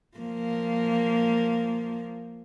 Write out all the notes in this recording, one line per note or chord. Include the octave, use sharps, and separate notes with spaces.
F3 A#3